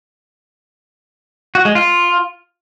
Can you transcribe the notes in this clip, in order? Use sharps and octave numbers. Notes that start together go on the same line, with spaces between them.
F#4
G#3
F4